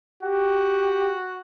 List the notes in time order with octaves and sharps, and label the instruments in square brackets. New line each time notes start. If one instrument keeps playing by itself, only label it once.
[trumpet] F#4 [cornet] G4